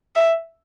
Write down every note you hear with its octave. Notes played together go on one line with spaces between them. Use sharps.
E5